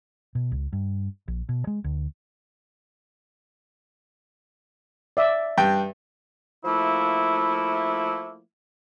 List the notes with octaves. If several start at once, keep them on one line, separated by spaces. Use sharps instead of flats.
B2
C#2
G2
A#1
B2
G#3
D2
D5 E5
G2 G5
F3 A3 A#3 E4